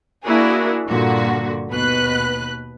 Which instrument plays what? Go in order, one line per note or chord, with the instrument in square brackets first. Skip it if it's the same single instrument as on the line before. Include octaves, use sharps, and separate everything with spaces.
[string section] A#3 D4 E4 F#4 G#4 A#4
G2 A#2 D3 F#4
D#2 B2 B4 F#6